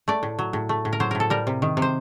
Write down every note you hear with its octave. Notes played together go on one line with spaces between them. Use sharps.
A3 D5
A2
F#3
A2
A3
A2
A#4
F#3 C5
A2 A#4
A4
G3 A#4
C3
D#3
C3
C5